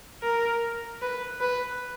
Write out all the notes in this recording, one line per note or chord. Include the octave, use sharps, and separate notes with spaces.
A#4
B4
B4